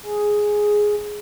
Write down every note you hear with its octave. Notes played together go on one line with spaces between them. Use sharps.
G#4